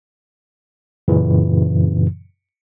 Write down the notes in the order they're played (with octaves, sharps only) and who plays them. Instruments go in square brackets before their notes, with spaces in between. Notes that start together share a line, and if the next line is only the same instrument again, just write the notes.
[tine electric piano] F#2 A#2 C#3 E3